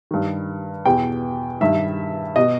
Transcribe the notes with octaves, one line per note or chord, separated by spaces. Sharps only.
G2 D#3
E2 B2 G5
G2 D#3 E5
B2 D#5